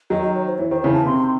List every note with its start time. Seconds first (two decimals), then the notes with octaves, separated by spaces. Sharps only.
0.10 D#3 F#3 D#5
0.22 D#5
0.35 C#5
0.47 C5
0.58 E3 C#5
0.70 D#3 C5
0.82 C#3 E3 C#5
0.94 A5
1.06 C3 D#3 C6